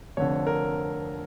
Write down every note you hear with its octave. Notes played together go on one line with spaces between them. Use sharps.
F1 F2 D3 C#5
A#4